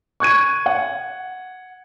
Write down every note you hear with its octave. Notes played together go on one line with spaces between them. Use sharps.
C#6 F#6 G#6 D#7
F#5